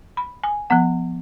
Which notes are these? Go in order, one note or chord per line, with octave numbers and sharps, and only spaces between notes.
B5
G#5
F3 B3 F#5